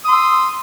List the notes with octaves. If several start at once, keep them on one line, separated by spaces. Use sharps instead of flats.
C6 D#6 E6